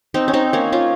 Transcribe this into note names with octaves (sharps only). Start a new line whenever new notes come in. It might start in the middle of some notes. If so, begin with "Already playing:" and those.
C4 D#4
C#4
C4 D#4
A#3 C#4
C#4 F4